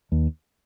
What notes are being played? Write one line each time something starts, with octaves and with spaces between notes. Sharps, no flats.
D#2